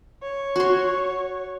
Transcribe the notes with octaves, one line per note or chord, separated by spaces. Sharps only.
C#5
F#4 C6